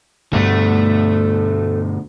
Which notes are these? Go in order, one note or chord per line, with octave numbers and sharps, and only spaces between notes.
D2 G2 B2 A3